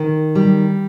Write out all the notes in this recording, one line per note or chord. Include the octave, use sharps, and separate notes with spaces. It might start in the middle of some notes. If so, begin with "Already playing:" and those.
Already playing: D#3
G3